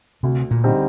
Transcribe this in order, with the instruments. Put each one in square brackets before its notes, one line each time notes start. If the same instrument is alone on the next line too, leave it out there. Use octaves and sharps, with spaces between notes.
[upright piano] D2 [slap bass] C3
[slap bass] A#2
[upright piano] D3 G3 C4 D#4